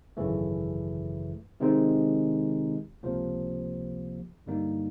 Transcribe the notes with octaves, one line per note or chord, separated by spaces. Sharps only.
G#1 F#2 C#3 E3 A3
C3 D#3 G#3 C4 D#4
C#2 C3 F3 A#3
G2 D3 G3 A#3 D#4